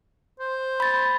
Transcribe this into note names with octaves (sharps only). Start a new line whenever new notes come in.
C5
B5 A6